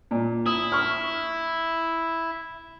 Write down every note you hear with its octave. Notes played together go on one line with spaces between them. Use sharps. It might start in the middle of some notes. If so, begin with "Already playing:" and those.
A#2
E4 D#6
C#6 F6